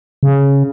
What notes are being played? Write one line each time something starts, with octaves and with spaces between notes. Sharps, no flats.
C#3